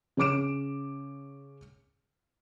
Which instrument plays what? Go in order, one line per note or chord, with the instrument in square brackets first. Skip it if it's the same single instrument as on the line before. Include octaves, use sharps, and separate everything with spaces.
[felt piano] C#3 C#5 D6 D7 E7